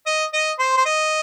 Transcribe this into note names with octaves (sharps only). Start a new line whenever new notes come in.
D#5
D#5
C5
C5
D#5